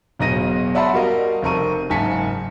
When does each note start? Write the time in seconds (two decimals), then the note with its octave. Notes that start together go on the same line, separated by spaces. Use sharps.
0.19 E1 B1 B2 D#5 A#6 D#7
0.75 D5 E5 F#5 A5 B5 C6
0.94 G3 F#4 A#4 D#5 F5
1.42 F1 C4 A#4 A5 C#6 D#7
1.90 F#1 G#2 G#5 A5 B6 C#7